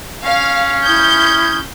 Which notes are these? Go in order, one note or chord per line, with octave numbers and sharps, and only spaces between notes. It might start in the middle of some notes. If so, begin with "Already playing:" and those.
C#4 F5
E4 D#6 G6 G#6